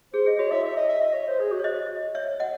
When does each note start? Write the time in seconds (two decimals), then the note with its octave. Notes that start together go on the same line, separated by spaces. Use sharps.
0.13 G#4 C5
0.26 G#4 D#5
0.39 F#4 C#5
0.51 E4 E5
0.64 E5
0.77 D#5
0.89 E5
1.02 D#5
1.14 C#5
1.27 C5
1.40 G#4
1.51 F#4
1.60 C#5
1.64 C5 D#5
2.15 C#5 E5
2.40 D#5 F#5